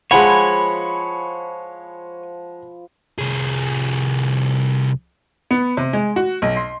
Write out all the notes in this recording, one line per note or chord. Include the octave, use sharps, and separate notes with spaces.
F3 G#3 C#5 F#5 G#5 B5
C2 G#4
B3
C3
G#3
F#4
B1
C6